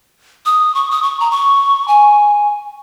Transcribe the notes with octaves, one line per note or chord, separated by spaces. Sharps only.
D#6
C#6
D#6
C#6
A#5
C#6
G#5